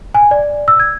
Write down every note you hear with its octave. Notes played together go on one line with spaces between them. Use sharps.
G#5
D5
E6
G#6